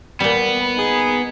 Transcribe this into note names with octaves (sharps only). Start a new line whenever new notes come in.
A#2 G3 B3
D#4 G#4